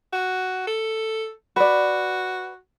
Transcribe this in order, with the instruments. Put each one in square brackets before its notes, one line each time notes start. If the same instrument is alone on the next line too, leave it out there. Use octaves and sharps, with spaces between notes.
[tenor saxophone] F#4
A4
[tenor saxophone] F#4 [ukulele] B4 D5